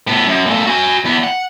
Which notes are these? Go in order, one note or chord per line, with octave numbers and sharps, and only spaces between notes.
A2 B3
F#2
A#2 A3
F#4 G#5
E2 B3
F#5